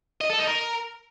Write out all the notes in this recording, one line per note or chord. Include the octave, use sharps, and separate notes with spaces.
D#5
A4
D#4
A#4